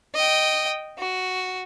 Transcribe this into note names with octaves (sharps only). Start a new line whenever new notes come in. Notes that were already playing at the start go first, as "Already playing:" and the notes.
D#5 G5
F#4